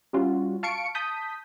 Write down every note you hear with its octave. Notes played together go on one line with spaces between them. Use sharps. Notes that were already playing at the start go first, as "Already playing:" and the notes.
G3 C#4 F4 F#4
F5 A5 C#6 C#7 D7
A5 D#6 G6 B6